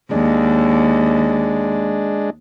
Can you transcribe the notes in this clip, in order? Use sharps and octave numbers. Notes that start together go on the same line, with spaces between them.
D#2 G#3 D4